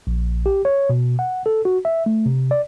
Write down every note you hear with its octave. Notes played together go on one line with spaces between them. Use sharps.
A#1
G4
C#5
B2
F#5
A4
F#4
E5
A3
C3
D5